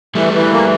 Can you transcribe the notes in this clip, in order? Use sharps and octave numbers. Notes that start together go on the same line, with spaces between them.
E3 G3 A3
E3
A#3